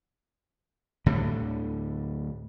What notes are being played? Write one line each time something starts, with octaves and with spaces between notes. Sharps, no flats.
D2 A2 D3 G3